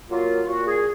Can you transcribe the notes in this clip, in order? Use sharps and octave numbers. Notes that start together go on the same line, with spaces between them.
F#3 A#3 F4
A#2 F#4
G#4